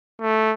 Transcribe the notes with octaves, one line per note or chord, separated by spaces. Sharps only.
A3